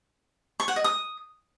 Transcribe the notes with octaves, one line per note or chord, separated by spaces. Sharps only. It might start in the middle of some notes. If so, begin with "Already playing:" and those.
C#6
F#5
D#5
D#6